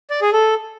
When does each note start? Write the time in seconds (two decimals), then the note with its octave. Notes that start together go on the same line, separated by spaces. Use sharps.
0.10 D5
0.22 G#4
0.33 A4